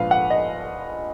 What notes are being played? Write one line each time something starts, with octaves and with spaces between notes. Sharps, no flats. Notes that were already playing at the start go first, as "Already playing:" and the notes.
Already playing: A#1 G#2 F3 B4 F5
F#5
D#5